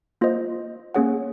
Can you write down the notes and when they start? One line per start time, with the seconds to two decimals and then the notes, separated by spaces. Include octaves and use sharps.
0.21 A#3 F4 C5 D#5
0.94 A#3 C#4 G#4 C#5 F#5